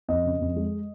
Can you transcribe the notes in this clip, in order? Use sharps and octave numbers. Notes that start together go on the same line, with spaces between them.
F2 D#5
C#3
F2
G#3